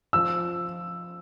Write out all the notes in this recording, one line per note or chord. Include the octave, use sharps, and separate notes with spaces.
F3 E6